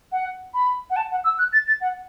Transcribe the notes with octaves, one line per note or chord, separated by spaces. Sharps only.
F#5
B5
F#5
A5
F#5
E6
F#6
A6
A6
F#5